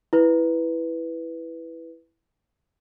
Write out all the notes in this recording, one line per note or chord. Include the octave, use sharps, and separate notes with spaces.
E4 B4